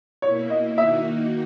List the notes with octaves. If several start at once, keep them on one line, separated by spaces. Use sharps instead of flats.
B2 A#3 E4 C#5
D#5
D#3 A#3 D#4 F#4 E5